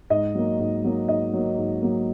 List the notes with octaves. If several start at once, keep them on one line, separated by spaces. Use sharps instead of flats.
G#2 D#5
F#3 A#3
G#2
F#3 A#3
G#2 D#5
F#3 A#3
G#2
F#3 A#3